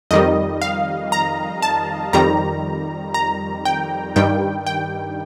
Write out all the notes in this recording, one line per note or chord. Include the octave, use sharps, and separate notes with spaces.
F2 D#3 G3 D#5
F5
A#5
A5
F2 D#3 G3 A#5
A#5
G5
G2 D#3 G3 G5
G5